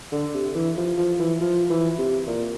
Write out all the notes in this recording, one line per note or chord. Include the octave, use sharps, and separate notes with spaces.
D3
C3
E3
F3
F3
E3
F3
E3
C3
A#2